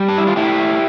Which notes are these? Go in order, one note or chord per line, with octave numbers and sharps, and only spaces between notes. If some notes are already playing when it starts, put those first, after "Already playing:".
Already playing: G3
D4
E4
F4
A2 E4 G4